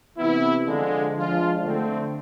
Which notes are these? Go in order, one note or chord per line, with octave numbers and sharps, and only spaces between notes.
C3 E3 B3 E4
D3 F3 G#3
F3 G#3 D4 F4
D3 A3 C4